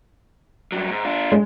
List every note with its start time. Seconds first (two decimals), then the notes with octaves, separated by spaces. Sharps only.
0.72 G2 F#3
0.90 G#2
1.05 D4 F4
1.32 G#3